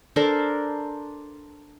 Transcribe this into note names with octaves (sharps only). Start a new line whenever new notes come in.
D4 A4 A#4 C5